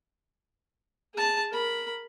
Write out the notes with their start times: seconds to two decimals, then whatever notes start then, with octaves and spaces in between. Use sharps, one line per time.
1.14 G#4 A5
1.51 A#4 B5